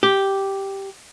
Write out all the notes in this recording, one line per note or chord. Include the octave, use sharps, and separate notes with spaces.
G4